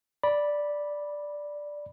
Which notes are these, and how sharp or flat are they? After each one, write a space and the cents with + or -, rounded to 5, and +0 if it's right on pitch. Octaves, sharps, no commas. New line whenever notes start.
D5 +0 B5 -10